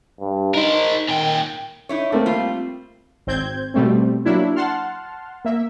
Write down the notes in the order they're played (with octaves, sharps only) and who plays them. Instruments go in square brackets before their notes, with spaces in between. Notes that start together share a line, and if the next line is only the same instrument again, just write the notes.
[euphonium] G2
[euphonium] D#4 [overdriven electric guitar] A#4 C5
[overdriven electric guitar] A#2 G5 [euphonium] D#3
[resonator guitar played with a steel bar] D#4 E4 C#5
[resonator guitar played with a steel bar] G3 [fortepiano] A3 A#3 C4
[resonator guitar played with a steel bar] G3 F4
[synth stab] G#1 C4 G6 G#6
B2 G3 A3 C4
F#3 A#3 D4 E4
F#5 A5 C6 F6
A#3 E5